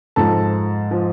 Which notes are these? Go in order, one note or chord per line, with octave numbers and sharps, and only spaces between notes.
G#2 F3 A4 A5
F3